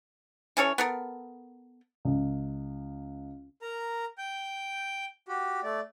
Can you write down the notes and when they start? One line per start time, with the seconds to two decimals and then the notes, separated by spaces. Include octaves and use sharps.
0.57 E3 C#4 A4 C#5
0.78 B3 A4 A#4
2.05 C#2
3.62 A#4 A#5
4.18 G5 G6
5.28 F#4 G4
5.63 A3 D5